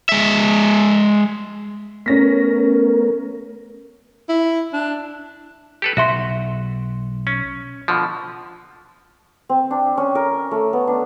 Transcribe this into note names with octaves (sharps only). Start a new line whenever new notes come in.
G#3 E5
A3 B3 C#4 A#4 A#6 B6
E4
D4
G4 A4 B4
B1 F#4 E5 C6
C#4
B2 D3 F3
C4
D4
C#4
A#4
A3
B3
D4